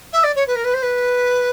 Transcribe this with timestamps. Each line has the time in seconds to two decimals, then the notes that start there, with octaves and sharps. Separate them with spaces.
0.12 E5
0.23 D5
0.35 C#5
0.47 B4
0.55 A#4
0.64 B4
0.73 C5
0.82 B4